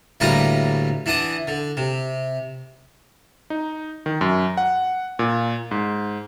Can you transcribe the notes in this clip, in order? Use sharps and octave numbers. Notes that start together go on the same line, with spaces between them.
D2 A2 G3 A#3 B4 A#5
E3 D4 F#5 D#6
D3
C3
D#4
D#3
F#2
F#5
A#2
G#2